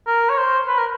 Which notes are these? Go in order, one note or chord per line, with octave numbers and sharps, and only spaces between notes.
A#4
C#5
C5
B4
A#4